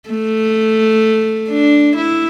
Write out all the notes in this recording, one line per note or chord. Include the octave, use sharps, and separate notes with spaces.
A3
D4
E4